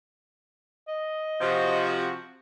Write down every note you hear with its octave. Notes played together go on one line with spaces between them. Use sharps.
D#5
C3 F3 F#4